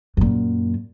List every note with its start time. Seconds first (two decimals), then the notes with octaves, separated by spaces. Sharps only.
0.17 F#2 A#2